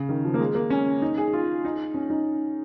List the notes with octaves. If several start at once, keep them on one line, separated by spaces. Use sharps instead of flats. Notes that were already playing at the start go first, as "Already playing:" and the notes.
Already playing: C#3
D#3
F3
A#3
G#3
A#3
C#4
D#4
G#4
F4
D#4
C#4
D#4